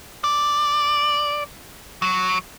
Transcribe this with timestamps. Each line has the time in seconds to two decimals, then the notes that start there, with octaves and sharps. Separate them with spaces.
0.24 D5
2.02 F#3